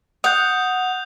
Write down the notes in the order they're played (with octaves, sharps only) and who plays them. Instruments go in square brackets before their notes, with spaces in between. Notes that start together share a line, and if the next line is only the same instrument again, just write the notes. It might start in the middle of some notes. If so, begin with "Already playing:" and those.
[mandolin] F#5 [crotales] D#6 G6